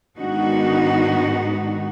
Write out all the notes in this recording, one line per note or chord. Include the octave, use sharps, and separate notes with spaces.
G#2 D#3 G#3 B3 D4 D#4 F#4